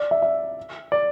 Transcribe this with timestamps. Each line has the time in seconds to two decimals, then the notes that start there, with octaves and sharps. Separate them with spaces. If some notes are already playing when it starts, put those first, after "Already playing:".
Already playing: D5
0.11 E5
0.22 E5
0.92 D5